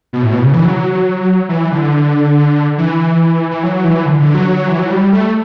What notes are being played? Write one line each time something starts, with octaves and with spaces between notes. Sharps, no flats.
B2
A2
B2
C#3
E3
F#3
E3
D3
E3
E3
F#3
E3
D3
D3
F#3
E3
F#3
G3
A3